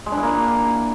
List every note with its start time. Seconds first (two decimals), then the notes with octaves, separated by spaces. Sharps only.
0.06 G#3
0.12 D4
0.17 E4
0.23 A#3